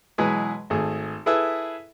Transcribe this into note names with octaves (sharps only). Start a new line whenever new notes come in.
B2 E3 F#3 G#3 G#4 B4
G#1 A3 G#4
E4 G#4 A4 B4 E5 E6